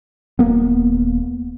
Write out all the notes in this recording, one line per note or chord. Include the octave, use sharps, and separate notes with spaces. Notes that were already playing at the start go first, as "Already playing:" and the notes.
D#1 A#3 B3